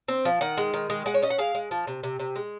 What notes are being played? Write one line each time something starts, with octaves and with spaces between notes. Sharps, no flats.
C4
F3
D#3 F#5
G#3
D#3
G#3
G#3 F#5
C#5
C#4 D#5
F#5
G#3 F5
G#3
F3
C3
C3
C3
G#3